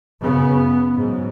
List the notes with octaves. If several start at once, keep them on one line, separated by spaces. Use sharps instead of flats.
F#2 C#3 B3
G#2 F#3